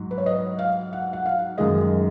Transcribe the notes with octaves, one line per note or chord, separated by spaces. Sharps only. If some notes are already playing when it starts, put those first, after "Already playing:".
Already playing: G#2 F#3
B4
C#5
D#5
F5
F#5
F#5
F5
F#2 D#3 G#3 D#5